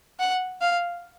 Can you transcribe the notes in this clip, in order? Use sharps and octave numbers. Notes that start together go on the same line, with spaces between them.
F#5
F5